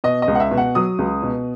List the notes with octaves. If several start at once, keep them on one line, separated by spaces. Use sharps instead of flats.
B2 D#5
D#5
C#2
F#5
E5
B2
F#5
F#3 D#6
C#2
B2